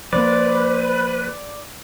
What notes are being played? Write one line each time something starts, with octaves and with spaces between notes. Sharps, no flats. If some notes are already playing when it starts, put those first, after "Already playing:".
F3 A#3 B4 C5 D5